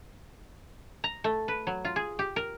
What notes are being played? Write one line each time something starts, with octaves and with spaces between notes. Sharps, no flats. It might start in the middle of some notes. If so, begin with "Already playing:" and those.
A#5
A3
B4
F#3
F4
G#4
G4
A#4